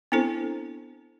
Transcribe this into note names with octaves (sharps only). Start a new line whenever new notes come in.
B3 C4 D4 E4 A4 C5